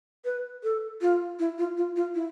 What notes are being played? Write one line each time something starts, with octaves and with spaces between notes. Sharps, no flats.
B4
A4
F4
E4
F4
F4
F4
E4